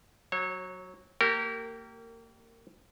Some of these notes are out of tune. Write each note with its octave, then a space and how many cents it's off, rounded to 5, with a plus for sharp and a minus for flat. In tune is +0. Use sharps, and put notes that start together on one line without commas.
F#3 +0 C#5 -30
A#3 -30 G4 -20 A#4 -25